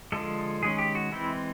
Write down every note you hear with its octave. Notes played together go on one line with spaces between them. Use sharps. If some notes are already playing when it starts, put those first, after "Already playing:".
D3 F3 G#3 A4
D#3 G#3 C#4 G#4
G4
F#4
E3 G#3 C4 E4